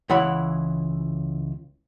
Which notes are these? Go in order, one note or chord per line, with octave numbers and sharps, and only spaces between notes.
C#2 E3 E4 F#5 B5